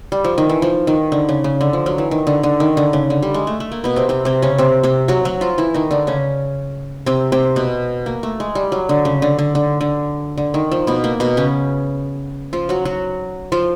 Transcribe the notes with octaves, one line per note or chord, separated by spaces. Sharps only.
G3
F3
D#3
E3
F3
D#3
D3
C#3
C#3
D3
F3
F#3
E3
D#3
D3
D3
D#3
D3
C#3
D3
G3
G#3
A3
A3
A#3
B2 B3
C3 C4
C3 C4
C3 C4
C#3 C#4
C3 C4
C3 C4
F#3 F#4
F#3 F#4
F3 F4
E3 E4
D#3 D#4
D3 D4
C#3 C#4
C3 C4
C3 C4
B2 B3
A#3
A3
G#3
G3
F#3
D3
C#3
D3
D3
D3
D3
D3
D#3
F3
B2 B3
A#3
B2 B3
C#3 C#4
F3 F4
F#3 F#4
F#3 F#4
F3 F4